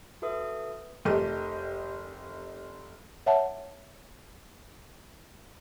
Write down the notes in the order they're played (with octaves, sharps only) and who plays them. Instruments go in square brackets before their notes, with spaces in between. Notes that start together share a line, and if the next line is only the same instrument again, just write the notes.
[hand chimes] F#4 A4 B4 E5 D#6
[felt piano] F1 A3 G4 A#4 D#5
[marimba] C#5 E5 F#5 A5